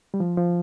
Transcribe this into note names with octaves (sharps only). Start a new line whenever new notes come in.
G3
F3
F3